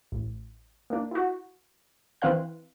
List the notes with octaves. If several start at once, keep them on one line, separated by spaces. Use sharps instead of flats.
A1
A#3 D4
E4 F#4
E3 C4 B4 C5 F5 F#6